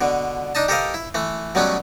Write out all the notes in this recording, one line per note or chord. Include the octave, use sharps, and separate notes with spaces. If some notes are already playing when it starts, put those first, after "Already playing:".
B2 D3
D4 D#4 D#5 A5
G4 A4 A#4 C5 D#5 F5
E4
E3 A3
B2 F#3 G3 A3 B3 C#4